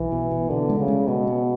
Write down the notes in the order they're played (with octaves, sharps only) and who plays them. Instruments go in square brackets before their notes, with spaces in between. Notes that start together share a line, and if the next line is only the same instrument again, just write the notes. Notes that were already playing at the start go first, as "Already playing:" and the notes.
Already playing: [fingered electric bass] B1 [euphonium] E3
[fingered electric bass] B2
B2
[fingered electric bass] B2 [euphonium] D3
[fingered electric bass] G#3
[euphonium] C#3
[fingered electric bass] G#3
[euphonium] B2 [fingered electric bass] B3
[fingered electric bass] B3